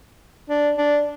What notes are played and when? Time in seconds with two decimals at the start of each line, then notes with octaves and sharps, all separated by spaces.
0.50 D4
0.78 D4